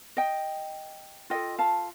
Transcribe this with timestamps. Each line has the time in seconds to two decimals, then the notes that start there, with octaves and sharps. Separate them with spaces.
0.17 D#5 G5
1.30 F4 A4 D#5 G5
1.58 F5 A5